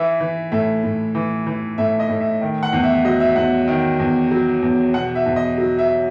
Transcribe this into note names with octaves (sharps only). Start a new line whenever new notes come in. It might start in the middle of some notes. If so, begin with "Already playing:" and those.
Already playing: E3 E5
E3
A2 E5
A2
E3
E3
A2 E5
D#5
A2
E5
D#3
F#5
E2
E5
F#3 D#5
E5
E2 F#5
D#3
E2
F#3
E2
B2 F#5
E5
E2
D#5
F#3
E5